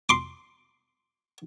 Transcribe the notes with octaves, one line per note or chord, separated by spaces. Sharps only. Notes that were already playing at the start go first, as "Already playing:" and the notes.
C6 D6